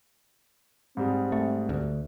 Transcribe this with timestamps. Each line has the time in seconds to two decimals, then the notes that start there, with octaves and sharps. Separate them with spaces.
0.97 G#2 G3 C4 G#4
1.32 A3
1.69 D2